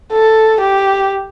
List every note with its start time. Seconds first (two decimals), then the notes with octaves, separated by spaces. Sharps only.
0.12 A4
0.61 G4